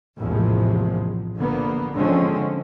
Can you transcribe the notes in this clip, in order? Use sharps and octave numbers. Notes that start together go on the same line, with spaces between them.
A#1 E2 A2 C3 F3 G#3
A#1 D3 A#3 B3
D3 F3 G#3 C4 C#4